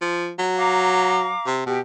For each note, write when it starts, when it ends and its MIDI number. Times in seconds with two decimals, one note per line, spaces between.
0.01 0.32 53
0.39 1.33 54
0.57 1.46 77
0.57 1.46 82
0.57 1.46 86
1.46 1.64 48
1.66 1.79 47
1.66 1.78 67